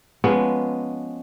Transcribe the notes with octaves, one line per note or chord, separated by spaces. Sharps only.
F3 G#3 B3 C#4